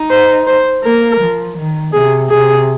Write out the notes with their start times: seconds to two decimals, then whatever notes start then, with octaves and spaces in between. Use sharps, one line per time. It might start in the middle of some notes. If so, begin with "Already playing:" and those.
Already playing: D#4
0.10 C5
0.47 C5
0.84 A#3 A#4
1.19 F3
1.57 D#3
1.93 C3 G#4
2.30 C3 G#4